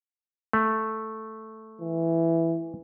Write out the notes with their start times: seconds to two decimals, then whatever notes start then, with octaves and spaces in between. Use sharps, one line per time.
0.53 A3
1.81 E3